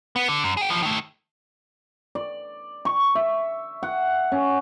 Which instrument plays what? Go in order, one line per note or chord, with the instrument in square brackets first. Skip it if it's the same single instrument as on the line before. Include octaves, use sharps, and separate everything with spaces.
[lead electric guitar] B3
D3
F#2
G#4 G5
E3 F3
D#3 A3
[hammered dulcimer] D5
C#6
E5
F#5
C#4